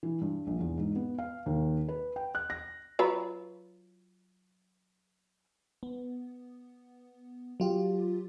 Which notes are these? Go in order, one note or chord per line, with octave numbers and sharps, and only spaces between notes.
E3
G2
A#1
E2
G#2
B3
F5
D#2
B4
G5
F#6
A#6
F#3 F4 B4
B3
F#3 F4 G4